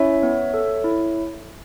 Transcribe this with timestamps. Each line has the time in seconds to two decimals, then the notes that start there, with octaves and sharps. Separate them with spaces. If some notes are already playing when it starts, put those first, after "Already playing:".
Already playing: C#4 E4 C#5 E5
0.23 B3
0.54 A4
0.84 E4